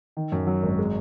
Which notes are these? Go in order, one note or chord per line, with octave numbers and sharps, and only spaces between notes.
D#3
F#2
F#3
G#1
G#3